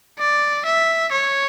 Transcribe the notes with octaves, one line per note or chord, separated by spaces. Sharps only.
D5
E5
C#5